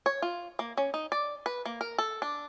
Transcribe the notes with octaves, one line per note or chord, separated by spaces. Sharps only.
C#5
F4
A#3
C#4
D#4
D5
B4
A#3
A#4
A4
D4